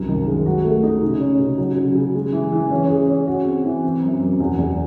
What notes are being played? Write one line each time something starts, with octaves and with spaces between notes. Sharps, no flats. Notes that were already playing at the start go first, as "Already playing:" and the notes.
Already playing: C2 F#2
D#3
G#3
F#4
A3
D#4
C#3
C#4
C#3
F#3
C#3
C#3
G#3
E3
E3
C#4
G#4
C#4
F#4
C4
E3
C4
F#2
F#2
E2
E2